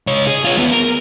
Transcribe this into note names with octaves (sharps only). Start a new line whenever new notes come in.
C#2 C#5
G#4
F4 C#5
B3 G#4
A#4